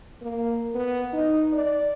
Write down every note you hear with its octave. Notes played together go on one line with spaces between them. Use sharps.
A#3
B3
D#4
D5